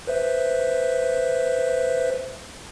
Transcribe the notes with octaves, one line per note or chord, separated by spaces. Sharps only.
B4 C5 E5